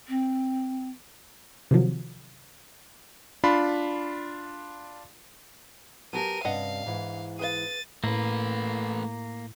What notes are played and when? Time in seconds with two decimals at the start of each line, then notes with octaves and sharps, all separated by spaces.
0.08 C4
1.71 C3 D#3 F3 F#3
3.44 D4 F4 B5 C6
6.13 F#3 B3 G4 A#4 G#5 A5 D#7
6.45 G2 C3 C#4 D4 D#5 F5 F#5
6.86 G#2 E3
7.39 G#4 B4 F5 A6 D#7
8.04 A2 A3 A#3 B4